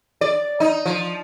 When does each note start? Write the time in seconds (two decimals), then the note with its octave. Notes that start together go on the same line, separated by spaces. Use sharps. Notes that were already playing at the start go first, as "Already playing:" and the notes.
0.21 D5
0.60 D#4
0.86 F3